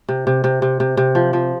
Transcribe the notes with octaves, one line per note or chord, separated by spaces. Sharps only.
C3
C3
C3
C3
C3
C3
F3
F3